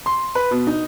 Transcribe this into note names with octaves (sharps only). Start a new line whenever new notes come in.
C6
B4
B2
D#4